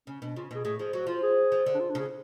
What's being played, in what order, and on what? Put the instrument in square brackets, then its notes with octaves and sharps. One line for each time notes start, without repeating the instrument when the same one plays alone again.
[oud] C#3 [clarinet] C#4
[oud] B2 [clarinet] D4
[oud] C#3 [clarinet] F4
[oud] B2 [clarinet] G#4
[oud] A2 [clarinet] G#4
[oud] F3 [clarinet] G#4
[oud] F#3 [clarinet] F#4
[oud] F3 [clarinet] F4
[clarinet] G#4
[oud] F3
D3
[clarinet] D4
F4
D4
[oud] C#3 [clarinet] G#4